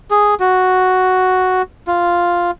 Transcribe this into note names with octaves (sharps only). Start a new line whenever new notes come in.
G#4
F#4
F4